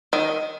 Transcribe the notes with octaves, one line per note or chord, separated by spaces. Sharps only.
D#3